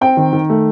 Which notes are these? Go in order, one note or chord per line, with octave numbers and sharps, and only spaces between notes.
C4 G5
D#3
D#3
A3